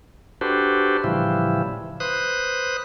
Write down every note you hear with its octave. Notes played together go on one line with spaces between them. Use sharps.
D4 F#4 G4 A4 B4 C5
A2 C#3 E3 F3 G3 E4
B4 C5 D#6 F#6